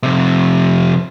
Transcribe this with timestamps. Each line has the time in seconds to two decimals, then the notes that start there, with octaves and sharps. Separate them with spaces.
0.03 F2 C3